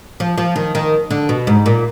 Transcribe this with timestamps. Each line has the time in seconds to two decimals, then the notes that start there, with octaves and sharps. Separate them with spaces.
0.20 F3
0.38 F3
0.56 D#3
0.75 D#3
1.11 D3
1.29 B2
1.47 G#2
1.66 A#2